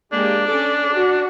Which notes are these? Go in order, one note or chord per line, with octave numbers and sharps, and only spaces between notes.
G#3 A#3 D4 G4
C#4 A4 D5
F#4